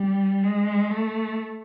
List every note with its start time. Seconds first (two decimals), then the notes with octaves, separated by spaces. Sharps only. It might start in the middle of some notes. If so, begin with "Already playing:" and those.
Already playing: G3
0.44 G#3
0.91 A3